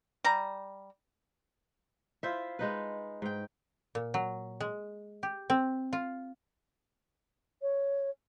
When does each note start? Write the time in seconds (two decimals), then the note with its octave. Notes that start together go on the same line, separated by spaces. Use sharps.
0.24 G3 A#5
2.23 E4 F4 C5 E5
2.59 G#3 D#4 B4
3.22 G#2 G5
3.95 A#2
4.14 F#3
4.60 G#3
5.23 G4
5.50 C4
5.93 F4
7.62 C#5